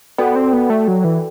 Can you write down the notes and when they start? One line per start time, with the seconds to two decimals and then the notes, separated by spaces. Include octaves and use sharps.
0.18 B3 F#4 A4 D5 G5
0.36 C4
0.53 B3
0.70 A3
0.88 F#3
1.04 E3